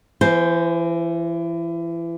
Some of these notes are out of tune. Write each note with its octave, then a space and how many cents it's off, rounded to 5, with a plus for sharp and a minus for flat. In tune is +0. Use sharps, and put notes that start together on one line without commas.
E3 +30 C5 +0